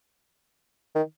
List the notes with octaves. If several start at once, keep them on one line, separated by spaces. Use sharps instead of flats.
D#3